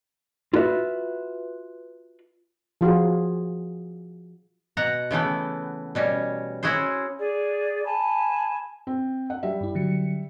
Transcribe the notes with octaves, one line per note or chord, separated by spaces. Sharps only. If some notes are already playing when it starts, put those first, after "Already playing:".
F4 F#4 B4 E5
F3 F4 F#4 G#4
B2 F#5 A#5
C#3 E3 A3 B3
B2 G3 C#4
C#4 E4 F#4 G#4 C5
G#4 D5
G#5 A5 B5
C4
F#5
G3 E5
G2 E4
D3 F#3 C#7